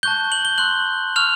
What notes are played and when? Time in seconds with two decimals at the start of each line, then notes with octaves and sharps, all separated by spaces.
0.03 A5 C#6 F#6 G6 G7
0.32 F#7
0.45 G7
0.58 C6 E6 F#6 G6 F#7
1.16 C#6 E6 F6 G6 F7